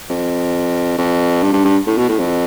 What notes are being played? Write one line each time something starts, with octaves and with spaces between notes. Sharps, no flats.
F2
F2
G2
G2
G2
A2
B2
A2
F2